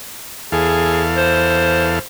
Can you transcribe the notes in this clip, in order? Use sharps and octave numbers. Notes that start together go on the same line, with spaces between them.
E2 G#4 A4 F5
C5